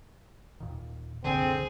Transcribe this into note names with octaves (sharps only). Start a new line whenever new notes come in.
D#2 A#2 D#3
C2 F#2 A#2 D3 C4 G#4